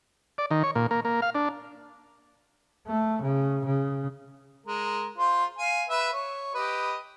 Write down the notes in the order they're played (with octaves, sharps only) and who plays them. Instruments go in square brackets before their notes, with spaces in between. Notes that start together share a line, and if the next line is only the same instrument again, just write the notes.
[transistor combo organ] D5
D#3
C#5
A#2
A#3
A#3
F5
D4
[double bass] A3
C#3
C#3
[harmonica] G#3 A#4
F4 C5
F5 G#5
B4 E5
C#5
G4 B4 D#5